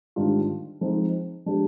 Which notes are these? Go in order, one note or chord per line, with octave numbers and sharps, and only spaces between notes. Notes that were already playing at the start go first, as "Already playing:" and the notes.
G#2 D#3 G3 D4 F4
F3 G#3 C4 D#4
F3 G#3 D4 G4